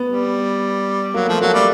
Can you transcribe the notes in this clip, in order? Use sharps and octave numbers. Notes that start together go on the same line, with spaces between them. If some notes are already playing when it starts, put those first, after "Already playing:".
Already playing: B3
G3
F#3 A#3
F3 A3
F#3 A#3
G3 A3